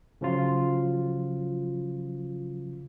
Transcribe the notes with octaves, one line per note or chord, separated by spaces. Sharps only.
C#3 F3 F#3 F4